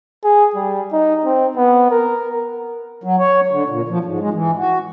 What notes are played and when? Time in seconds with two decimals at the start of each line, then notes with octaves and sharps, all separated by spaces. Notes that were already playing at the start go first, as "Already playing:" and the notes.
0.24 G#4
0.55 G3
0.92 D#4
1.25 C4
1.56 B3
1.91 A#4
3.04 F#3
3.19 C#5
3.51 D3
3.69 A#2
3.89 F3
4.04 G#2
4.20 G#3
4.34 E3
4.57 F#4